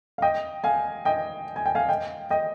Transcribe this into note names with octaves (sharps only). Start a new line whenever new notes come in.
F5
D#5 G5
F5 G#5
D#5 G5
G#5
G5
F5 G#5
D#5 G5
D#5 G5